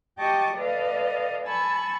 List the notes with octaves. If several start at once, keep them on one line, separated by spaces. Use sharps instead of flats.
G4 D#5 G5 A5 C#6 D6
A4 B4 D5 D#5 F5
G#5 A5 B5 C#6 E6